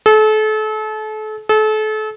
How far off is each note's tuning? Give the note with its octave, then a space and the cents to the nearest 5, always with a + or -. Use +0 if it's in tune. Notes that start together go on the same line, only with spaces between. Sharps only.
A4 -35
A4 -35